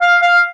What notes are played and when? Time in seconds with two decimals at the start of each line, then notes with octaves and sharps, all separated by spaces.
0.01 F5
0.22 F5